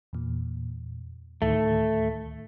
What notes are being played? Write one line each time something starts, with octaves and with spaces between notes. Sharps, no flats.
E2 A#2
D2 A2 D#3 A3